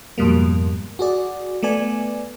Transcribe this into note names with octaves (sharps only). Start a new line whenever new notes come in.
F2 G#2 B2 G3 A#3
F#4 G#4 D5
A3 B3 D5 G#5